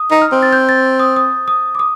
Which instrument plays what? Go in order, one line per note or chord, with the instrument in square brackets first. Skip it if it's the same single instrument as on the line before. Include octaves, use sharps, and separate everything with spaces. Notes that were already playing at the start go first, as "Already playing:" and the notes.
Already playing: [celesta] D#6
[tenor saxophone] D#4
[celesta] F6
[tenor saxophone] C4
[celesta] A6
G6
A6
D#6
D#6
D#6
D6
D#6